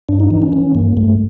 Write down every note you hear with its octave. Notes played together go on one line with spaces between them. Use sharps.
G2 D4
D#4
E3 D#4
C#4
E3 C#4
G2 A#3
G2 A3